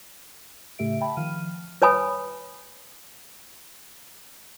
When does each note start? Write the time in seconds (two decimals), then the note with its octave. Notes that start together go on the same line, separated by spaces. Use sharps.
0.78 A2 C#3 A3 G4 E5 D7
1.01 E5 G5 A5 B5
1.17 D#3 F3 F5 F6 D#7
1.82 B4 C#5 G#5 B5 D#6